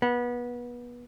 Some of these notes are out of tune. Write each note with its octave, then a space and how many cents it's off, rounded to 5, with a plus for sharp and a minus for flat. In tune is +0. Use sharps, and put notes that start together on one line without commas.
B3 -25